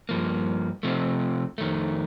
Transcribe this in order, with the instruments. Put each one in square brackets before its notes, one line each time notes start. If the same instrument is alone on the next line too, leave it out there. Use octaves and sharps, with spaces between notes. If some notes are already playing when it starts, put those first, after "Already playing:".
[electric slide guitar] G2 F3 A#3
C3 F3 A3
F2 D#3 A3